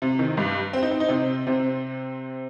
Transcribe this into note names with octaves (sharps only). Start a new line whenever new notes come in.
C3
D#3
G2 G3
C4
D#4
C4
D#4
C3 C4
C3 C4